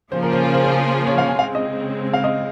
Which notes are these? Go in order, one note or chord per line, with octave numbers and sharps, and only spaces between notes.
C#3 F3 A#3 F4 G#4 C5
A#4
C5
A#4
C5
C5
C#5
F5
G#5
C#3 G#3 C4 F5
D#5
F5
D#5